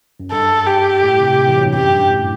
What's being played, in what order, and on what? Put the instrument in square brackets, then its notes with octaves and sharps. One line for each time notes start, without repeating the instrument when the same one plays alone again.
[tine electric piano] F#2
[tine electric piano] G2 [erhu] A4
[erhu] G4
[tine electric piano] A2
C3
C3
E3
F#3
G2
[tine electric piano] F#2 [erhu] G4
[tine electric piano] G2
A2